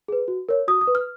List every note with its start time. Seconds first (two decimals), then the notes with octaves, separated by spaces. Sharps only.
0.08 G#4 B4
0.28 F#4
0.49 A#4 C#5
0.68 F#4 D#6
0.81 D#6
0.87 B4
0.95 F6